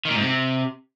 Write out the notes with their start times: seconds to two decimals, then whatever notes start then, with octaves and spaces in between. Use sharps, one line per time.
0.05 D#3
0.10 A#2
0.15 G#2
0.21 C3